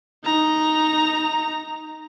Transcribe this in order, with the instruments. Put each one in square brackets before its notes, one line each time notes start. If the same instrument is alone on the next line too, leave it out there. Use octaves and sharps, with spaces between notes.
[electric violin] D#4 A#5